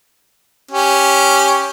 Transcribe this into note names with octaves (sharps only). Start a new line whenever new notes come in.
C#4 G4